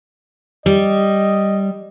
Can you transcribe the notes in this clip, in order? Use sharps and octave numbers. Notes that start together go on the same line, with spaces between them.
G3 D#5